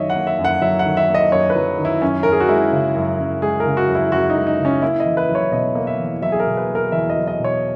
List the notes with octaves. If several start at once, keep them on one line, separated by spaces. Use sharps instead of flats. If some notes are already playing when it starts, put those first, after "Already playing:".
Already playing: F#2 D#3 F#3 C#5 D#5 E5
F#5
A#3
E5
F#2
F#5
F#3 E5
F#5
D#3
E5
A#3
D#5
F#2 C#5
B4
F#3
D#3
E4
F#2 C#4
F#2 A#4
G#4
F#4
G#3 E4
C#3
F#2
F#2
G#3 G#4
A#4
C#3
F#4
F#2
E4
F#2 F#4
D#4
G#3
D#4
C#3
C#4
A#3 E4
D#5
E2
B4
F#3
C#5
B2 D#5
A#3
E5
E2
F#3 E5
G#4
A#4
B2
B4
A#3
A#4
E2 E5
D#5
F#3
D#5
B2
C#5